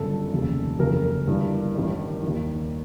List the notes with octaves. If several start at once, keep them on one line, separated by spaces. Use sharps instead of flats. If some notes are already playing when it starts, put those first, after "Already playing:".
Already playing: G1 F#2 C#3 A4
F1 D#2 C#3
F#1 F2 C#3 A#4
G1 G2 E3
A1 G2 D#3
D#2 D#3